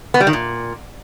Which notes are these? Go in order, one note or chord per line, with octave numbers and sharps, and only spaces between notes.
B3
G3
D#3
A#2